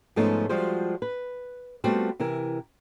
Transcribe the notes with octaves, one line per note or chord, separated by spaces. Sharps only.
G#2 F3 A3 B3 C#4 D#4
F3 G3 G#3 F4 F#4 C5
B4
G3 A3 B3 C4 F4 F#4
C3 E3 E4 A#4